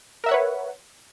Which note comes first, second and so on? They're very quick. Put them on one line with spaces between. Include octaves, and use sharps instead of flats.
A#4 E5 F#5 C#5 B4